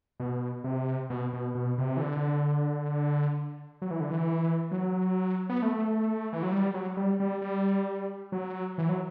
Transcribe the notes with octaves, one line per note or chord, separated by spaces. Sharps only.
B2
C3
B2
B2
B2
C3
E3
D3
F#3
E3
D3
E3
F#3
B3
A3
E3
F#3
G3
F#3
G3
G3
G3
F#3
E3
F#3